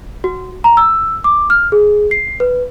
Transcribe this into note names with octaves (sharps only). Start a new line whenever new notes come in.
F#4
A#5
E6
D6
F6
G#4
C7
B4